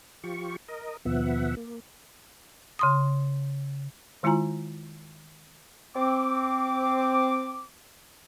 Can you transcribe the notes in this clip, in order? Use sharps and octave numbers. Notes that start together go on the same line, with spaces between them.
F3 F4 G4 C#6
A#4 D#5
D#2 B2 F3 B3 E5 F#5
A#3
C#3 C6 D#6
D#3 G#3 E4 F4 G#5 A#5
C4 D6